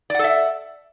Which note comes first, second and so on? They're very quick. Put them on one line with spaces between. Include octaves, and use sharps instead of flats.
D5 F#5 A4 E5